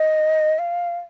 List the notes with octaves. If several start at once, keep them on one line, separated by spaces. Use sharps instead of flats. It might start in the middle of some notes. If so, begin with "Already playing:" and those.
Already playing: D#5
F5